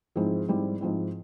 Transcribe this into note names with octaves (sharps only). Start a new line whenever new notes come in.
G#2 F3 G#3 C4 E4
G#2 G3 C4 E4
G#2 F3 C4 E4